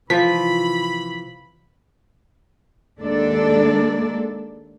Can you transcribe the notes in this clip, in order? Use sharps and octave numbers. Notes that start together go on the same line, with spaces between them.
C3 E3 F3 B5 B6
D#2 G#3 A#3 D4 A4 D5